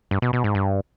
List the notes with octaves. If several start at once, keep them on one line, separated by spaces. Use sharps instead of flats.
G2
B2
B2
G#2
G2